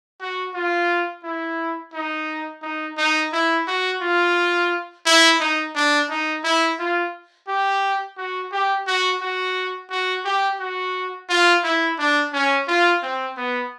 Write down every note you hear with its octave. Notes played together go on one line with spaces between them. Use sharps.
F#4
F4
E4
D#4
D#4
D#4
E4
F#4
F4
E4
D#4
D4
D#4
E4
F4
G4
F#4
G4
F#4
F#4
F#4
G4
F#4
F4
E4
D4
C#4
F4
C4
B3